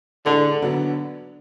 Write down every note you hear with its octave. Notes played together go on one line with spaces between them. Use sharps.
A2 D3 G#3 D4 A4 D5
D3 F#3 B3 D4